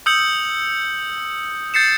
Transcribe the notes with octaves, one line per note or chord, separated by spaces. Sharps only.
D#6 E6 G6 C#7 F#7
G6 A6 C7 C#7 E7